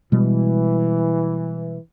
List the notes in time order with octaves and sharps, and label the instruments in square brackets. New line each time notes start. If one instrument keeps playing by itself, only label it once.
[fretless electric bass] B2 G3 G#3 [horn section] E3